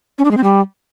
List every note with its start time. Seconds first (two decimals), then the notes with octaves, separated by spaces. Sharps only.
0.18 C#4
0.25 D4
0.31 G#3
0.37 C4
0.44 G3